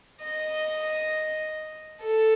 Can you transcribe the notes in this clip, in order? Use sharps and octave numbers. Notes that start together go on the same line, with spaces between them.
D#5
A4